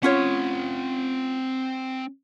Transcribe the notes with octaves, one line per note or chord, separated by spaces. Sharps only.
C4 C#4 F4 C#5 F#5